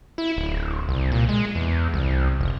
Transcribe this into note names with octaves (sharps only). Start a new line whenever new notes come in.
E4
D1
C2
A#2
G#3
E2
C2
F1